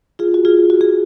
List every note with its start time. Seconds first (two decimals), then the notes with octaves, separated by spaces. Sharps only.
0.19 F4 G#4
0.34 F#4
0.45 F4 G#4
0.70 F#4
0.81 G#4